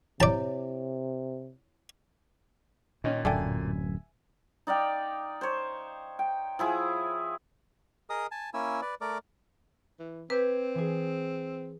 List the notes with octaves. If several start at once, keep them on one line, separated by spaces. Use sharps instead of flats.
C3 E4 C#5 D5 A5
A#2 D#3 C#4 D#4
D1 F#2 D4 A4 E5 G5 G#5
D#4 D5 F5 G5
C5 C#5
G5
F3 E4 G#4
G#4 A#4 D#5 D#6
G#5 A5
A#3 C#4 E4 G#5 E6
B4 D5
A3 A#4 D5 D6
E3
C4 B4 D6 G6 G#6
E3 G#4